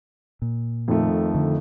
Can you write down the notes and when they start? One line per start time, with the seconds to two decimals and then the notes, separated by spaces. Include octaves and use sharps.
0.42 A#2
0.88 F2 D#3 A3
1.35 D3